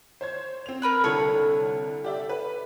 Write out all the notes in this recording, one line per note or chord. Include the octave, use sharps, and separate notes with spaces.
C5 C#5 G#6
C4 F7
A#4 B4 F#6
C2 D3 A4 C#5
G4 D5 E5
B4